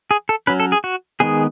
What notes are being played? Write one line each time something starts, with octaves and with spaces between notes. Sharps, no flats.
G#4
A4
F#3 C#4 B4
A4
G#4
F#4
D#3 G#3 B3 G#4